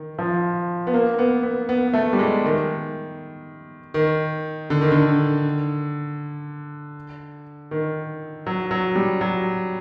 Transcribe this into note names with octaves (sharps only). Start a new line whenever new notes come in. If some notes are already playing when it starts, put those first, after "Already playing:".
Already playing: D#3
F3
B3
A#3
B3
B3
B3
A3
G3
G#3
D#3
D#3
D3
D#3
D3
D#3
F#3
F#3
G3
F#3